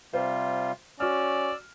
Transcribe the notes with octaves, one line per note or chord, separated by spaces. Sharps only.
C3 G3 F4 C5
C#4 F#4 D5 E6 F6